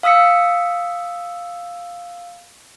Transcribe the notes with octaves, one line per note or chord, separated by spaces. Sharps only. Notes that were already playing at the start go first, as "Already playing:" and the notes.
F5 D#6 E6 B6 C#7